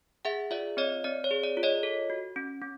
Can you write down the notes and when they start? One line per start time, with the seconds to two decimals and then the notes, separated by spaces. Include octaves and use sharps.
0.25 G#4 E5 F#5
0.51 F4 D5 E5
0.77 C4 C#5 D#5
1.04 C4 D5
1.24 C#5
1.31 G#4
1.43 D5
1.57 F4
1.63 C#5 D#5
1.83 A4
2.10 F#4
2.36 C#4
2.62 C#4